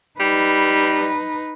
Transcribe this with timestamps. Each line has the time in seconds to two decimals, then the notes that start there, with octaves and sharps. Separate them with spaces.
0.20 G3 D#4 B4